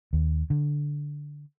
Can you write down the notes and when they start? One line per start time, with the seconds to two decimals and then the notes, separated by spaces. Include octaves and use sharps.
0.13 D#2
0.50 D3